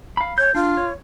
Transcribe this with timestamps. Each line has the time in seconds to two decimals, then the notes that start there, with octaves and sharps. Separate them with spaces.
0.17 F5 B5
0.38 C#5 G6
0.55 D4 F4
0.77 C#5